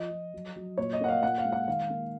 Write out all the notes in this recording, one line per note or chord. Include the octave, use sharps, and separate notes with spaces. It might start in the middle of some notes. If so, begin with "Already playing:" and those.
Already playing: F3 D#5
F3
F#3
F#3
A#2 C#5
D#5
A#3 F#5
F5
A#2 F#5
F5
G#3
F#5
D#3 F5
A#3